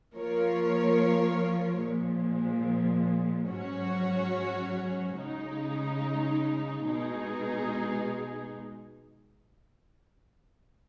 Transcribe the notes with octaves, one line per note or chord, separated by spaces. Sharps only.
F3 A#3 F4 A#4 C#5
A#2 F3 G#3
G#2 F#3 C#4 F#4 C#5
C#3 G#3 D#4
B2 G#3 D#4 G#4